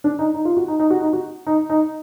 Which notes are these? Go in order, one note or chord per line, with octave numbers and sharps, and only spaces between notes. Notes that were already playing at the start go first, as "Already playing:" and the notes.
D4
D#4
D#4
F4
F#4
D#4
D#4
F#4
D#4
F#4
D#4
D#4